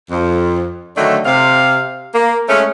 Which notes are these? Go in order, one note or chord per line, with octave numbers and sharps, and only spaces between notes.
F2
D3 D#3 F#3 A3 D4
C3 F5
A#3
G#3 A3 C#4